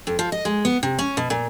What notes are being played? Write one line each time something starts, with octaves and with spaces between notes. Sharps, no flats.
F2
F3
D#5
G#3
B3
C3
C#4
B2
A#2